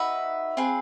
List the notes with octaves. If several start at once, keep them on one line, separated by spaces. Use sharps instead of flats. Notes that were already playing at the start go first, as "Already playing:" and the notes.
Already playing: D#4 F#4 B4 E5
C4 F4 G#4 B4